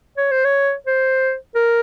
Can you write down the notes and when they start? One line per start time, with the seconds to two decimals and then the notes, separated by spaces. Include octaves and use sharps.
0.17 C#5
0.32 C5
0.45 C#5
0.87 C5
1.55 A#4